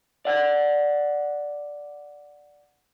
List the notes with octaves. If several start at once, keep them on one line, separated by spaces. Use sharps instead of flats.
D5 F#5